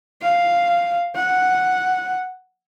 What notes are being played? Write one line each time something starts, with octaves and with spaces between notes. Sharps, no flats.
F5
F#5